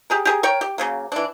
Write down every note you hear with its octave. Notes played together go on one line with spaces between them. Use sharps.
G4 G#4 A#4
G4 G#4 A#4
A#4 C#5 G5
G4
C#3 F#3 A#3
E3 D4